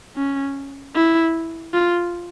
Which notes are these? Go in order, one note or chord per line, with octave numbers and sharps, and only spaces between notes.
C#4
E4
F4